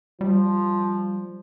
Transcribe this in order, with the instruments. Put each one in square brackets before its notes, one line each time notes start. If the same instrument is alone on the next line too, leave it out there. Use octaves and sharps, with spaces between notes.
[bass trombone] F3 [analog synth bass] G3